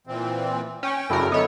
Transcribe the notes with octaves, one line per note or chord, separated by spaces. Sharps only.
A#2 E3 C4
C#4 G5
F#2 C#3 D4 E4 A4 A#4
D3 F#3 B3 A4 C#5 D#5 E5